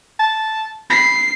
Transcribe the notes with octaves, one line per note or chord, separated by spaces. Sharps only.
A5
B5 C7